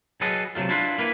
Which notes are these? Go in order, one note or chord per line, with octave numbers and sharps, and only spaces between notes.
F#3 G#4 A4 B4 D#5
C3 F#3 A3 F4
D4 E4 F4 A4 B4
A#3 E4 B4